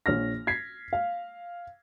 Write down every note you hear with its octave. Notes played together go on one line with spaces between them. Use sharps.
A#1 C#5 F6 A#6
G#6 B6 C7
F5